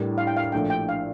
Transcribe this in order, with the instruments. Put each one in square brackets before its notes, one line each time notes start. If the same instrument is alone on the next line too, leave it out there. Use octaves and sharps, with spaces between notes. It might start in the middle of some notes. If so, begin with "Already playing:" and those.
Already playing: [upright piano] A2 G3 D4 G4 A#4
[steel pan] F5
G5
F5
[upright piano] A#1 A#2 A3 D4 [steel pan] G5
[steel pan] G5
F5